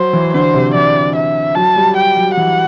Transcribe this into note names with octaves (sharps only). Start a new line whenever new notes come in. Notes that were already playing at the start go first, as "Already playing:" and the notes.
Already playing: F#3 C5
E3
D3 C5
C3
E3 D5
E5
F#3 A5
G3
G5
F#3
E3 F#5